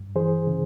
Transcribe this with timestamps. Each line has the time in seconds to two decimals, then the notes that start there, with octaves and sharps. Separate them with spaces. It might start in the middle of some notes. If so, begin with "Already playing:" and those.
Already playing: G2
0.16 E3 G#4 C5
0.47 C#3